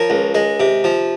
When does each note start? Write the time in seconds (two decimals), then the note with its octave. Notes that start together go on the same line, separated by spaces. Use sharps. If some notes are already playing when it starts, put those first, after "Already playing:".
Already playing: F3 A#4 C#5
0.10 C#2
0.35 G#3
0.60 C3
0.84 F3